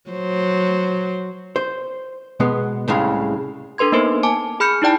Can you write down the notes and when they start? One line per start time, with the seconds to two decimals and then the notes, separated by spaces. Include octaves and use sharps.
0.10 F#3 C5
1.56 C5
2.40 B2 G#3 B3
2.88 C2 A2 C#3 G#3 F5
3.78 D4 A4 B4 C6 G#6
3.92 A#3 B3 D#4 A#4 C5
4.23 G#5 A5 D6
4.60 G#4 B5 F6 G6 C#7
4.82 D#4 E4 D5 G5 A5